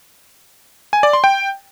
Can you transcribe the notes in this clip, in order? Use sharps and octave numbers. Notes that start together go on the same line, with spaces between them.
G#5
D5
C6
G5